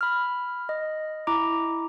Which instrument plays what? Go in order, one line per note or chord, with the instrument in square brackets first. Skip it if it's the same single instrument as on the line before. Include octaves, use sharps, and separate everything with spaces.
[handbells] B5 F6
D#5
E4 A#5 D6